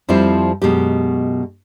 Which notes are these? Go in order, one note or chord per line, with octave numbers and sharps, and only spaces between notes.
F2 F3 G3 C4 E4
F#2 B2 G#3 G4